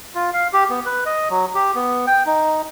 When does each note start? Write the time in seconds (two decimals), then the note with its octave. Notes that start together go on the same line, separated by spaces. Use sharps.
0.15 F4
0.33 F5
0.53 G4
0.70 B3
0.86 B4
1.06 D#5
1.30 F#3
1.55 G4
1.75 B3
2.07 G5
2.26 D#4